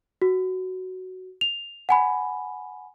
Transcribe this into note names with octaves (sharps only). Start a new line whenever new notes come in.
F#4
F7
F#5 G#5 B5